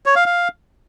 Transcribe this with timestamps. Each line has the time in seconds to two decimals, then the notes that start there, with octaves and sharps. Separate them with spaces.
0.06 C#5
0.16 F5
0.26 F5